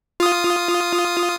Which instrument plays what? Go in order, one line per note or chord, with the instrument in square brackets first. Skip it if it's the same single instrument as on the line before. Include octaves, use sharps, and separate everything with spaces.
[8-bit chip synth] F4 D#6